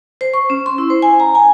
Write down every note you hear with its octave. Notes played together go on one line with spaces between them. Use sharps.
C5
C#6
C#4
C6
E4
C5
G#5
A#5
G#5